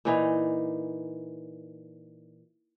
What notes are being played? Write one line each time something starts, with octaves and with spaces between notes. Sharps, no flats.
A#2 E3 D#4